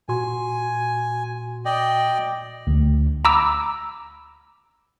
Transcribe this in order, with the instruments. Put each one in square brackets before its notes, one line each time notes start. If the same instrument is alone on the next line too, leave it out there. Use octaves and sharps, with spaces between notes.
[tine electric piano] A#2 F#4 C6 [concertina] G#5
[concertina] D5 D#5 G5
[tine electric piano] D2
[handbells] A#5 B5 D6 E6